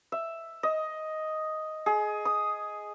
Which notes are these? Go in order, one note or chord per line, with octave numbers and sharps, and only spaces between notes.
E5
D#5
G#4
D#6